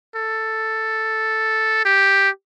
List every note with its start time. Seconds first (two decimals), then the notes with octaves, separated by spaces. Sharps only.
0.15 A4
1.85 G4